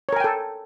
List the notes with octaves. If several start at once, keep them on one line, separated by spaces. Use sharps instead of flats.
A4 A#4 C#5 G5 G#5